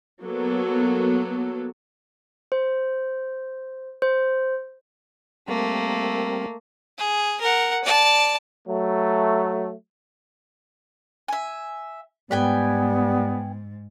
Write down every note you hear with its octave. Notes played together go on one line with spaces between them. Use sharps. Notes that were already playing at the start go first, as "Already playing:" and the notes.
F#3 A#3 B3 A4
C5
C5
G3 A3 A#3 C4 A#4
G#4
A#4 F#5
D5 A5
F#3 A3
E5 G#5
G#2 G3 B3 B4 G5 G#5